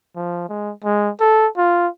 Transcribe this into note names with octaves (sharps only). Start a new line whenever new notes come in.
F3
G#3
G#3
A4
F4